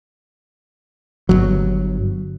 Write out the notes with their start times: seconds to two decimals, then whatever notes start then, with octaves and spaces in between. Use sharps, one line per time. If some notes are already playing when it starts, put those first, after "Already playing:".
1.29 G1 C2 F#3